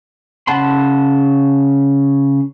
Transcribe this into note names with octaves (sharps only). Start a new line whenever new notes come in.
C#3 F#5 A5 B5 C6